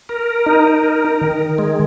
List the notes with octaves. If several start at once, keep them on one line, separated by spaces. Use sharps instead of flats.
A#4
D#4
A#4
D#3
G#3